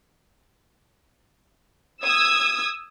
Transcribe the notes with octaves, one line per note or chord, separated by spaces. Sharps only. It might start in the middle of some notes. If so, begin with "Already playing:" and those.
D#6 E6 G#6